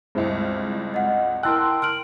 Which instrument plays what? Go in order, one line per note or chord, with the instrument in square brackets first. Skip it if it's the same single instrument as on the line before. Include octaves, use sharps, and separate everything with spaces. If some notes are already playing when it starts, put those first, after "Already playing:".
[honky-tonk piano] C#2 G2 [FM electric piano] G#3 C4 E4
[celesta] D#5 F#5
[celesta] E4 E6 [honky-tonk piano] A#4 F#6 [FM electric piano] G5 A5 C6
[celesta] F6 D7 F#7